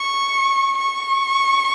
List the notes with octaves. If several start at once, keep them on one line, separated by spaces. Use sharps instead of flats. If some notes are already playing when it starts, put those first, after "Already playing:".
Already playing: C#6
C#6